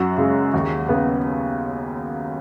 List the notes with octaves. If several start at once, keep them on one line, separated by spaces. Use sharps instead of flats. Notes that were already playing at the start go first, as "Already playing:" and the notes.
Already playing: F#2 F#4
C#3 G#3
D#2
C#3 B3